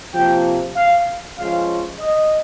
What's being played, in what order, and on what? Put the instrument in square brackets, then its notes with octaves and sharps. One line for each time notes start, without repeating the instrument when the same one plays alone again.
[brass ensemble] C3 F3 A#3 G5
F5
F3 G#3 C#4 F4 F5
D#5